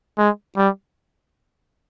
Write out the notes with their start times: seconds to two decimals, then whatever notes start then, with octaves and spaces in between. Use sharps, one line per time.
0.18 G#3
0.57 G3